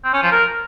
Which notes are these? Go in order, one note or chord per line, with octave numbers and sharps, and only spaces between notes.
C4
C#4
F3
A#4